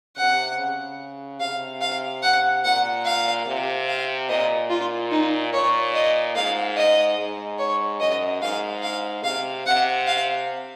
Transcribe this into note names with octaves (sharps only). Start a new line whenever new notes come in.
C3 F#5
C#3
C3 F5
F5
F#5
A#2 F#5
F5
C3
F5
A#2 D#5
F4
D#4
A#2 C#5
D#5
G#2 F5
D#5
G#2
C#5
F#2 D#5
G#2 F5
F5
C3 F5
C3 F#5
F5